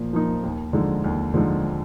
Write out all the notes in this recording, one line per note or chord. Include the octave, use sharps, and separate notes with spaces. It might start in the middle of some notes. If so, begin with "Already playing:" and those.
Already playing: A#2 F3 A#3
F3 A#3 D#4
D#2
D3 F3 G#3 D#4
D#2
D3 F3 G#3 D#4